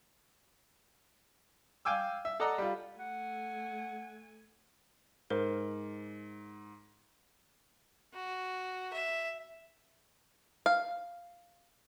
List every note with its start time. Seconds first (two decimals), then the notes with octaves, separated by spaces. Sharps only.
1.85 F5 G5 G#5 D6 E6
2.25 E5
2.40 A4 D5 D#5 F#5 A#5
2.58 G3 F4
2.98 A3 F#5 G#5
5.30 G#2 A#4 C5
8.14 F#4
8.93 E5
10.66 F5